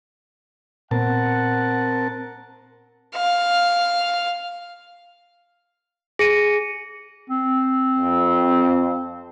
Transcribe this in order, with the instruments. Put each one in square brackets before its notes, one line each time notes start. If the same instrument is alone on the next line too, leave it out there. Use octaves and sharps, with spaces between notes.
[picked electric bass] A#2 B3 [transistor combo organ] C4 A#4 A5 [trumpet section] F#5
[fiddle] F5
[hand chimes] G#4 [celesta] A#6 C#7 D#7
[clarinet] C4
[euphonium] F2